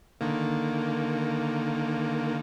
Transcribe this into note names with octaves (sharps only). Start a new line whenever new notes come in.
D3 D#3 A#3